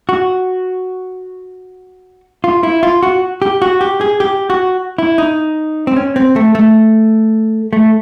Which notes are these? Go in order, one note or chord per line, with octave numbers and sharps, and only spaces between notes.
F#4
F4
E4
F4
F#4
G4
F#4
G4
G#4
G4
F#4
E4
D#4
C4
C#4
C4
A3
A3
A3